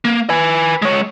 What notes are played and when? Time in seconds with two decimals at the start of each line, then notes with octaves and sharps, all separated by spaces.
0.05 A#3
0.30 B4 G#5
0.82 G#3 C#5